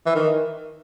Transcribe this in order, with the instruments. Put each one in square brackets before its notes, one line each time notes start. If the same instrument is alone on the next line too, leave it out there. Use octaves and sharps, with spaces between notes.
[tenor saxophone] E3
D#3